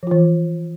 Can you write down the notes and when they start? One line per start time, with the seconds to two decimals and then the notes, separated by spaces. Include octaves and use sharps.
0.03 F3
0.07 F4
0.11 E3